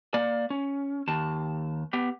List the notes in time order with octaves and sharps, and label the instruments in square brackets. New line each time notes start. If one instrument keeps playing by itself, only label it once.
[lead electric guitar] A#3 D5
C#4
D#2 A5
B3 G4